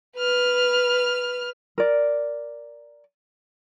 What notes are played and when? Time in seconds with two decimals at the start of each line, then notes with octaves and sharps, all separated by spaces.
0.17 B4 F6
1.78 A#4 D5